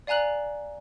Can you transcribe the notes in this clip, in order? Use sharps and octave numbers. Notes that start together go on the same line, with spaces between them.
D5 F5 G#5 A#5 F#6 F#7